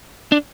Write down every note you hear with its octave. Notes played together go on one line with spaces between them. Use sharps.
D4